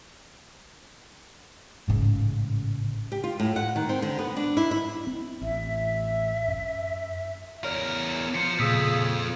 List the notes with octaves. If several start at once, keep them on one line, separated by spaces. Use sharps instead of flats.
A1 G#2 C#3
G4
F4
A2
F#5
D#3
C4
D3
B3
D4
E4
E4
C4
A1 E5
F#2
E2 A#4 C#5 D5 F6
F3 C5 C#7
F2 A#2 C#3 D#6 E6 B6